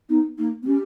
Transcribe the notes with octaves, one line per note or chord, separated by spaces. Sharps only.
B3 D#4
A#3 D#4
B3
C#4 G4